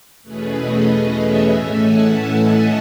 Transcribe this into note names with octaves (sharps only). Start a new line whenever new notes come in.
E2 B2 A3 C#4 G#4 B4
B4 D#5
C#5 E5
A2 E3 A3 C#4 E5 G#5
F#5 A5
E5 G#5
D#5 F#5